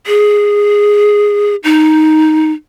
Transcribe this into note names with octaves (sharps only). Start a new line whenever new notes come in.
G#4
D#4